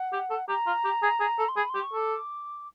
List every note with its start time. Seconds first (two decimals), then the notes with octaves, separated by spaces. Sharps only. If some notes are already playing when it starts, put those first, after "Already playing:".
Already playing: F#5
0.13 G4
0.30 A4
0.48 G4 A#5
0.67 F4
0.84 G4
1.02 G#4
1.20 G#4
1.38 A4
1.49 C6
1.56 G#4 B5
1.70 G4 C6
1.83 C#6
1.93 A4 D6